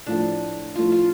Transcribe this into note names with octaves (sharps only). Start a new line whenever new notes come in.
A2 F3 A3 D4
A2 F3 A3 F4
F4